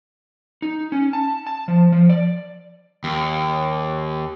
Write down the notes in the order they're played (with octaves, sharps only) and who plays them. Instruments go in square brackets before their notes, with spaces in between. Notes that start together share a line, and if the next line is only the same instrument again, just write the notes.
[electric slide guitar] D#4
C#4
A5
A5
F3
F3
D5
[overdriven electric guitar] D#2